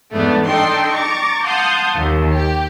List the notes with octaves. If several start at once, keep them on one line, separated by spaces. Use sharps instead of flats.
E2 G#2 A3 B3 D4
D4 D#4 A4 D#5 G5 C6
A#5 C#6 D6 A6
F5 F#5 A5 C6 D#6 G6
D#2
G4